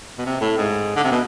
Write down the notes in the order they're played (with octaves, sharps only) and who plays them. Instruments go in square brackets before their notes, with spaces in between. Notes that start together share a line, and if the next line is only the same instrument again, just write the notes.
[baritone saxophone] B2
C3
A2
G#2
D3
C3
B2